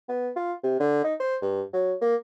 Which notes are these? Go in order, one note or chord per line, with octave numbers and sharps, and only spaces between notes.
B3
F4
C3
D3
D#4
C5
G2
F#3
A#3